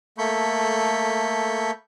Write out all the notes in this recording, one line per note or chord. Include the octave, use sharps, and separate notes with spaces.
A3 A#3 A4 B5 C#6 G6